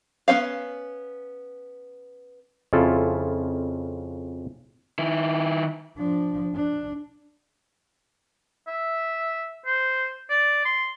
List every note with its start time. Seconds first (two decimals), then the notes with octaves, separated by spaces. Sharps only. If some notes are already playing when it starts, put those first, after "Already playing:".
0.28 B3 C#4 C#5 F5
2.73 F2 C#3 E4 F4 A4
4.98 D#3 E4
5.98 F3 D4
6.55 D4
8.68 E5
9.66 C5
10.30 D5
10.65 C6